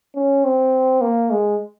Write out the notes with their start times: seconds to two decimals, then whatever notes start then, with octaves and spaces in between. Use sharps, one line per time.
0.15 C#4
0.44 C4
1.01 A#3
1.31 G#3